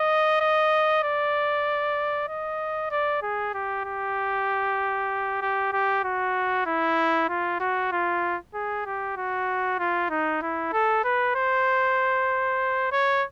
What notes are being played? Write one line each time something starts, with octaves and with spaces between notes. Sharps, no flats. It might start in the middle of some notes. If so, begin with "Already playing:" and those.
Already playing: D#5
D#5
D5
D#5
D5
G#4
G4
G4
G4
G4
F#4
E4
F4
F#4
F4
G#4
G4
F#4
F4
D#4
E4
A4
B4
C5
C#5